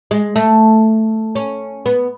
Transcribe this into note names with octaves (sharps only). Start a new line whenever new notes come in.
G#3
A3
C#4
B3